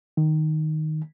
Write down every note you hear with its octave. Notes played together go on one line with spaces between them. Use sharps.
D#3